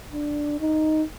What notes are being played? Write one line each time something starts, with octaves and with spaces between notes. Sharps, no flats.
D4
D#4